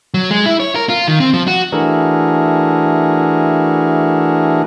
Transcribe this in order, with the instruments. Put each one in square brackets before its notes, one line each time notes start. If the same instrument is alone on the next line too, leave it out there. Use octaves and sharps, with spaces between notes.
[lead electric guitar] F#3
G#3
E4
C#5
A#4
F4
D#3
C4
F3
F#4
[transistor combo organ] E3 A3 D4 F#4 G#4 A#4